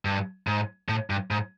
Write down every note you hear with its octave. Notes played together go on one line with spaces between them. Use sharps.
G2
G#2
A2
G2
G#2